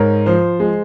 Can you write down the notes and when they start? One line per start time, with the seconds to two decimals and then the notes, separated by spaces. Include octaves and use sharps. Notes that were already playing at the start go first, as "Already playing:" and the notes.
Already playing: G#2 A#4 C#5
0.26 F3 C5
0.60 G#3